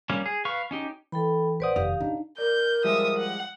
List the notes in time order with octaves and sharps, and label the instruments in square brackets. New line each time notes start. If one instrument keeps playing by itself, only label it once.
[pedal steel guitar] G3 A#3 C#4
G#4
B4 F5 C#6
C#4 D#4 G4
[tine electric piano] E3 [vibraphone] A4 G5 B5
[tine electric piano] A#1 C5 D#6 [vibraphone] B4 D5 F#5
[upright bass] F1 D#3 [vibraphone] G4 F5 [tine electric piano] D#6
[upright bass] C#3 [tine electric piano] D4 D#4
[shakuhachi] A#4 [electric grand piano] D5 [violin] G6
[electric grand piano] F3 G3 G#3 [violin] E5 D#6
[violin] F#5